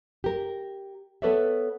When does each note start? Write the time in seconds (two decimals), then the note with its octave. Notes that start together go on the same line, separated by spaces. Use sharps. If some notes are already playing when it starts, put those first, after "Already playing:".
0.24 G4 A#4
1.22 B3 A4 B4 C#5 D5 E5